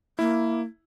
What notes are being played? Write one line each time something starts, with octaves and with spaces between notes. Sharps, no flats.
A#3 E4